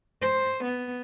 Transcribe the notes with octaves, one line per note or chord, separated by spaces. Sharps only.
C5
B3